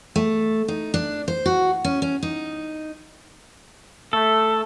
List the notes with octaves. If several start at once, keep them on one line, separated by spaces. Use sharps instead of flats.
A3
D#4
D4
C5
F#4
C#4
C#4
D#4
A3 A4